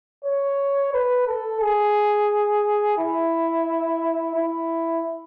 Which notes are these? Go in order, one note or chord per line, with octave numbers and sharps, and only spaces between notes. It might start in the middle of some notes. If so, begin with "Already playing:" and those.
C#5
B4
A4
G#4
E4
E4